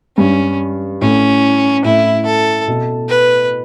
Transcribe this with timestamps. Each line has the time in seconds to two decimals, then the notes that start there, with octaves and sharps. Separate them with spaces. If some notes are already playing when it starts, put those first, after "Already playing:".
0.17 G2 C#4
1.01 A2 C#4
1.84 A2 E4
2.26 A4
2.68 B2
3.09 B4